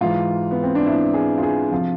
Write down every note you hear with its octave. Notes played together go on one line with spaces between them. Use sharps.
G#2 E3 F4
B3
C4
D4
E4
G#4
F4
G#4
C3 F3 F4